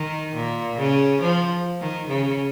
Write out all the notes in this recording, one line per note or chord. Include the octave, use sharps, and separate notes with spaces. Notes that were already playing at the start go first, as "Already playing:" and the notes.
Already playing: D#3
A#2
C#3
F3
D#3
C#3